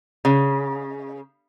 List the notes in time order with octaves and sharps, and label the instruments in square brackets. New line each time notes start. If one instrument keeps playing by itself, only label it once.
[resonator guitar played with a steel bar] C#3